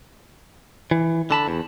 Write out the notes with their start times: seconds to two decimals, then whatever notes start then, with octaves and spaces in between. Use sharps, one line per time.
0.91 E3
1.31 D3 A5 B5
1.48 E2